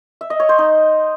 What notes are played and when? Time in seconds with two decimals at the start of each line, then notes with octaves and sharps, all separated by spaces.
0.21 E5
0.30 D#5
0.40 C#5
0.49 C5
0.58 D#4